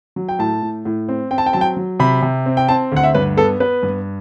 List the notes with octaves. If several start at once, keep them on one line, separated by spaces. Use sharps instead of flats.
F#3
G5
A2 A5
A2
A2
C4
C4 G5
A5
G5
F#3 A5
G5
F#3
C3 B5
C3
C4
G5
C4 A5
D2 F#5
E5
G2 B4
B3 A4
B3 B4
G2